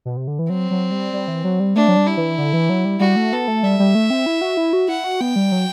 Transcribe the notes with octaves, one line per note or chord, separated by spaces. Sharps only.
B2
C3
D3
E3
F#3 C4
F#3
G3
G3
E3
F#3
G3
A3 D4
F#3
G3
E4
E3
D3
E3
F#3
G3
G3 F#4
A3
B3 A4
A3
G3 E5
G3
A3
C4
E4
F#4
E4
F#4
E4 F#5
F#4
B3 G5
G3
F#3